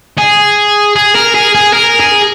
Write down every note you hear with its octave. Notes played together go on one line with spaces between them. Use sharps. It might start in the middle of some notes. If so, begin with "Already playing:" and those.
G#4
G#4
A#4
G#4
G#4
A#4
G#4